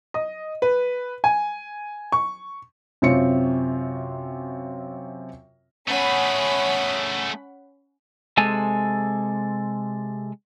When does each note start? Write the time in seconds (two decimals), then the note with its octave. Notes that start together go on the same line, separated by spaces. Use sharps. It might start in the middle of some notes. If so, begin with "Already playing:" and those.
0.14 D#5
0.62 B4
1.24 G#5
2.12 C#6
3.02 F#2 C3 C4 F4 C#5 C#7
5.88 A3 C#4 G#4 F#5 B5
8.38 C3 G#3 A4 G#5